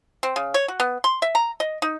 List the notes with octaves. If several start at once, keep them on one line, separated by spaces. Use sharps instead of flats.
C4
C#3
C#5
F#4
B3
C6
E5
A#5
D#5
D#4